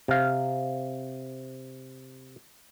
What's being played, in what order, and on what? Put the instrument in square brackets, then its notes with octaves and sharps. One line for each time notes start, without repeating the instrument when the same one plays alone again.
[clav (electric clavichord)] C3 F5